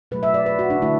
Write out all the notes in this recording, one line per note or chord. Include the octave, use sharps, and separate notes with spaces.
B2 F#3 A3 B4
E5
D5
B4
F#4
D4
D3 A3 E4